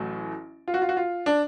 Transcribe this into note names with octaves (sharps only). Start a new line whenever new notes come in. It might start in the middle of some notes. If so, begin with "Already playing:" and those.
Already playing: A1 A2 F#3 A3
F4
F#4
F4
F#4
F4
D4